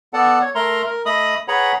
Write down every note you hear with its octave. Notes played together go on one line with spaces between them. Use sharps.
B3 A4 D5 F#5 A5
C#5
A3 A#4 A#5 C6
A#4
A3 D#5 B5 D#6
G#4 B4 C#5 F#5 A#5 B5